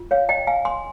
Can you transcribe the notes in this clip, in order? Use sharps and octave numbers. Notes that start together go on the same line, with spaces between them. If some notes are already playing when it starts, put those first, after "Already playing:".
Already playing: F4
C#5 F5
D#5 G5
F5 G#5
G#5 C6